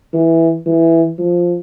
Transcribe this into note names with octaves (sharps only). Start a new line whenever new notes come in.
E3
E3
F3